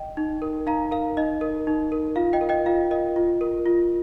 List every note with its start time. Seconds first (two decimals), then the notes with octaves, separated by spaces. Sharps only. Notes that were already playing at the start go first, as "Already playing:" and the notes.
Already playing: D#5 G5
0.17 D#4
0.42 A#4
0.66 D#4 F5 A#5
0.91 A#4 F5
1.17 D#4 D#5
1.41 A#4
1.67 D#4
1.92 A#4
2.16 F4 F5
2.33 D#5 G5
2.41 A#4
2.49 D#5 G5
2.66 F4 F5
2.91 A#4 D#5
3.16 F4
3.41 A#4
3.66 F4